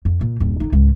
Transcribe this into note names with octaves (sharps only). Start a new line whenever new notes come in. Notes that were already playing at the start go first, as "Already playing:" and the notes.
F2
A#2
D#1 G2
D3 D#4
C#2 G#2